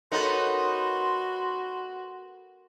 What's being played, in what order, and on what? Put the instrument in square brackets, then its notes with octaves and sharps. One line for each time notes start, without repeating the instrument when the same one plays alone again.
[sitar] B3 C#4 D#4 [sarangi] F#4 [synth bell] A4 A#4 [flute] C6